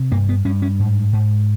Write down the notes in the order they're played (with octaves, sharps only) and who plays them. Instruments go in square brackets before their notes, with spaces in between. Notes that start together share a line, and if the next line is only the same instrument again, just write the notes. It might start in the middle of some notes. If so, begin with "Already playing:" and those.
Already playing: [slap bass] C3
G2 A#3
B3
G2 C#4
C#4
G#2
G#2